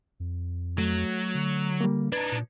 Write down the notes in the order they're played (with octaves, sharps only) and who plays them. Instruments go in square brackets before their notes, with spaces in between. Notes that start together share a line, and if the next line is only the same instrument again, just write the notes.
[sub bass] F2
[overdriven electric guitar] F#3 [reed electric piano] A3
[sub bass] D3
[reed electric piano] G3 A#3
[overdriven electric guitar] D4 D#4 [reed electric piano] B4 G#6
[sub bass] A#2